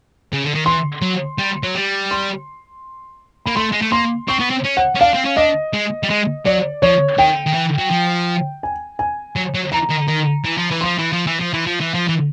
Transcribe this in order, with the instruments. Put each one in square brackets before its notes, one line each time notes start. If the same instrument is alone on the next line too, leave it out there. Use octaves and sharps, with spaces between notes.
[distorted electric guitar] C#3
D3
D#3
[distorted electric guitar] E3 [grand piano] C6
[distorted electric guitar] F#3
G3
F#3
G3
[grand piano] C6
[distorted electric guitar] A#3 [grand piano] B5
[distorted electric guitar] A3 [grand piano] C6
[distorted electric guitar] G#3
A3
[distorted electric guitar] A#3 [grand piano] C6
[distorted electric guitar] C4 [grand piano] C#6
[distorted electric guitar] B3
C4
C#4
[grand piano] F#5
[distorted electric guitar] C#4
[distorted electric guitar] D4 [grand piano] F5
[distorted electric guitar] C4
C#4
[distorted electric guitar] D4 [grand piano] D#5
[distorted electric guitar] G#3
G3
G#3
[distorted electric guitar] F#3 [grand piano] D5
[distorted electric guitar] F3 [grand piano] C#5
[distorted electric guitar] D#3 [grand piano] G5
[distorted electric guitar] D#3
E3
F#3
F3
[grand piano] G#5
G#5
[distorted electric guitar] F#3
F#3
[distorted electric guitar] E3 [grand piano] A#5
[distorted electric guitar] D#3
D#3
E3
F3
E3
[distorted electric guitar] F3 [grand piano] C6
[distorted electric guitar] E3
F3
E3
F3
E3
F3
E3
F3
E3